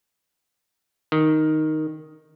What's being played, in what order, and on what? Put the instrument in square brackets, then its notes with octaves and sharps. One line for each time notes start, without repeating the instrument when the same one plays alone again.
[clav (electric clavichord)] D#3